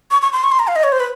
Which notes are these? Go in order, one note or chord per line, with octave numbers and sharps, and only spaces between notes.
C#6
C#6
C6
C#6
C6
A#5
F5
D#5
C#5
C5
B4